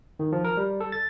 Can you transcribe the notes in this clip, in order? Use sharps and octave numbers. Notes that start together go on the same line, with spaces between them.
D#3
F3
A#4
G3
A4
A6